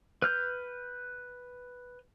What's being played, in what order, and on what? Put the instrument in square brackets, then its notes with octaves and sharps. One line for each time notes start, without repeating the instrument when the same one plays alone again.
[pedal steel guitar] B4 F6 G6